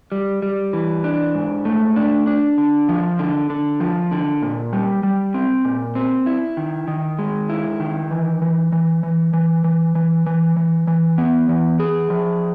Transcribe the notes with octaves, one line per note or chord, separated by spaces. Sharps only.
G3
G3
E3
D4
G#2
A3
D4
D4
D3
F3
D3
D3
F3
D3
A#2
G3
G3
C4
A#2
C4
E4
D#3
D#3
G#3
E4
D#3
E3
E3
E3
E3
E3
E3
E3
E3
E3
E3
B3
E3
G#4
F3